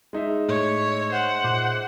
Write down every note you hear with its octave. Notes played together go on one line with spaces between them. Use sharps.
G#3 D#4 E5
A2 A3 C#5
C5 F#5
A#2 D6